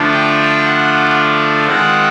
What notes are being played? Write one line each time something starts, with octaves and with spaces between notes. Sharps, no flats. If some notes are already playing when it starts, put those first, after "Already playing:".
Already playing: D3 F3 A3 D4 F4
G5
F#5
D#3 G#3 C4 F4 F#5